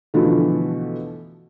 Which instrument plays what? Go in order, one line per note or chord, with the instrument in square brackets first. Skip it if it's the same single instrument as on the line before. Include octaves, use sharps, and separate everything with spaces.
[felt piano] B2 D3 E3 F3 A3